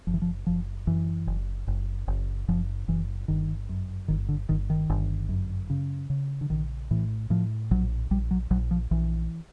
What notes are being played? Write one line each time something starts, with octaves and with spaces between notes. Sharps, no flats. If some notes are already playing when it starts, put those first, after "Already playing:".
F#1 F3
E3
F3
F#1 F3
F#2 E3
F#1
F#1
F#1
F#1 F3
F#1 E3
G1 D#3
F#2
G1 D#3
D3
G1 D#3
D#3
G1
F#2
C#3
C#3
D3
A#1 D#3
A2 E3
A2 F3
A#1 F#3
A#1 G3
F#3
A#1 F#3
F3
A#1 E3